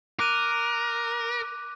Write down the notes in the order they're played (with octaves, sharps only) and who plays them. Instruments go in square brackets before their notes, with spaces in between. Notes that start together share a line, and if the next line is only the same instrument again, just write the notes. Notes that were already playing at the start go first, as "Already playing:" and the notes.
[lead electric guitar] A#4 [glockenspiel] D6 F#6 D#7